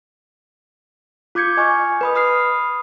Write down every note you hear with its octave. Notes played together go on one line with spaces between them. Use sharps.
F4 D6 G6 G#6 C#7
D#5 G#5 C#6 F6
B4 B5 D#6
B5 D#6 F6 C7